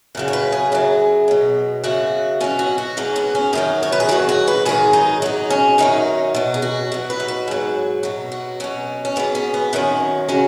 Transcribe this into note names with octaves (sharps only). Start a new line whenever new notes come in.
F#2 C#3 F#3
C#5
B4
G#4
F#2 C#3 F#3
B2 F#3
F#2 C#3 F#3 F#4
B2 F#3 C#4
F#4
F#4
G#2 F#3 C#4
B3
C#4
F#2 D#3 F#3 D#4
C#5
B4
G#4
G#2 D#3 F#3 F#4
F#4
B4
G#2 D#3 F#3 G#4
D#4
G#2 F#3 D#4
C#4
F#2 D#3 F#3 D#4
B2 F#3
G#4
F#4
B2 F#3
B4
D#4
F#4
G#2 F#3
B2 F#3
F#4
B2 F#3 C#4
C#4
G#2 F#3 B3
C#4
B3
F#2 D#3 F#3 C#4
C#3 F#3 C#4